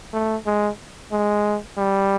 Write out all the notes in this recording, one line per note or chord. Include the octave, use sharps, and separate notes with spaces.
A3
G#3
G#3
G3